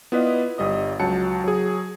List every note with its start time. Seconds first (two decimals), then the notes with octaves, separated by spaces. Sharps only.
0.12 B3 E4 F4 B4 D5 D#5
0.58 G1 G3 D#5 D#6
0.99 C#2 F#3 A5 C#7
1.44 F#3 G#4